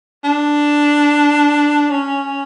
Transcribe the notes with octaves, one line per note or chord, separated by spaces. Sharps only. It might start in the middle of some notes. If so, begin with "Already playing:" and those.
D4
C#4